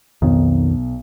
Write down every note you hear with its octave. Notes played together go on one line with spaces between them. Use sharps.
B1 F2 D#3